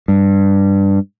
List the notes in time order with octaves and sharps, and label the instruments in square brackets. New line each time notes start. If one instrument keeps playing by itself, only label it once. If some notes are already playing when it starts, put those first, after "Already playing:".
[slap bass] G2